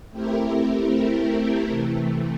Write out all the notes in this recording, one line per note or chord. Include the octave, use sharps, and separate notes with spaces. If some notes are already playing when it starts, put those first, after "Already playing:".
A3 C4 E4 G4 A#4
A3 C4 E4 G4 A#4
C3 E3 A3